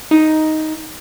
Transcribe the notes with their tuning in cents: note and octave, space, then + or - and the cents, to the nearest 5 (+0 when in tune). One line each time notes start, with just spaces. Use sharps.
D#4 +5